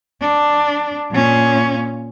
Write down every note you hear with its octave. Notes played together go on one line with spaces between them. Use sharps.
D4
A#2 C#4